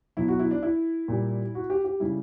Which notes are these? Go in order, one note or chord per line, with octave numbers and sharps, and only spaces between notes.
B2 F#3 E4
F#4
E4
D4
E4
A#2 G3
F#4
G4
G4
C#3 G3 E4